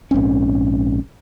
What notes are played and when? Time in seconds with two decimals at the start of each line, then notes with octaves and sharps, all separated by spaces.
0.11 A#1 G#2 C4 C#4